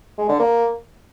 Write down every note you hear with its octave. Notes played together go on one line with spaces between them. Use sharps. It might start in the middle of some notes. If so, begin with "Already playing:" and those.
G#3
D3
A#3